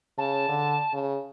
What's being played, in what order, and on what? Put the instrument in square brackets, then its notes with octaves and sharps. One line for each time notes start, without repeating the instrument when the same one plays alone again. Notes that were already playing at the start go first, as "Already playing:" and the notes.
[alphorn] C#3 [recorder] A5
[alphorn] D3
C#3